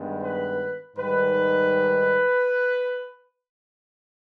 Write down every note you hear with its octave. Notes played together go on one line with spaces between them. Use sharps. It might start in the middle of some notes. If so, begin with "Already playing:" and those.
Already playing: G2 D#3 G#3 B3
B4
G#2 D#3 G3 B4